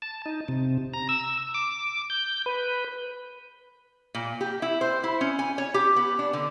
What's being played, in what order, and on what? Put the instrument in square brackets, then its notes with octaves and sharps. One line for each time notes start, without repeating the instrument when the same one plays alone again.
[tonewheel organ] A5
D#4
C3
A#5
E6
D6
G6
B4
[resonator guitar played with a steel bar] A#2
G4
E4
C5
E4
C#4
G#5
C#5
G4
B3
D4
D3